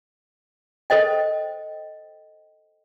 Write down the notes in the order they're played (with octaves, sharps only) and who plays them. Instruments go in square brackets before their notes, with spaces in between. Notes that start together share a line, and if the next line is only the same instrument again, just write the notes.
[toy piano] A4 C5 D#5 G5